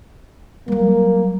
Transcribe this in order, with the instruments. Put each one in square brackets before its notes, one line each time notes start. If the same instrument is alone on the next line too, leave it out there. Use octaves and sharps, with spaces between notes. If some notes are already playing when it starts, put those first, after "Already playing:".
[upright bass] F#3 G3 [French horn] A#3